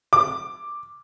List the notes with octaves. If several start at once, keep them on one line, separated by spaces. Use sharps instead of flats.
D6